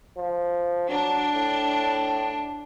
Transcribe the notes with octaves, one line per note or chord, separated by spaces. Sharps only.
F3
F#3 D4
A2